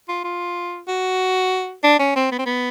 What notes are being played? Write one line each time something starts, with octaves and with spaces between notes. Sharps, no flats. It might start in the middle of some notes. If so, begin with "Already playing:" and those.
F4
F4
F#4
D4
C#4
C4
B3
C4
B3